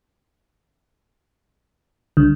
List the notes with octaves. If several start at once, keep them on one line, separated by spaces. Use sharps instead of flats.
C2 D3